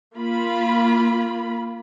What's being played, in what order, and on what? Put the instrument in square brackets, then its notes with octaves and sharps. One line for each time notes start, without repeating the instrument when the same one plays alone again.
[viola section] A#3 F4 B5